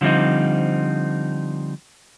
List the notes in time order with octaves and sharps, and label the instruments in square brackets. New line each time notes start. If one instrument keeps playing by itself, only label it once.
[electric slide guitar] D3 F3 G3 C4 D#4